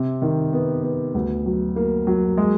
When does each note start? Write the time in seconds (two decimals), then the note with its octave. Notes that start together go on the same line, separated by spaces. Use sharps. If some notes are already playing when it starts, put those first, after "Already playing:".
Already playing: C3
0.22 D#3
0.53 B3
0.83 B3
1.14 D2
1.46 F#3
1.76 A#3
2.07 F#3
2.37 G#3